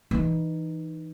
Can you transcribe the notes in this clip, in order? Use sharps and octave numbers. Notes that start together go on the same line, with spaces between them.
E3 D#4